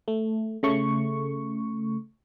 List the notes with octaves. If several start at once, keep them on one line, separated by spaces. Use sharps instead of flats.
A3
C#3 A3 C#6